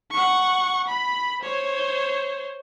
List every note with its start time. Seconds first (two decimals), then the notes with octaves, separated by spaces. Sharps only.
0.11 F#5 C#6
0.88 B5
1.41 C5 C#5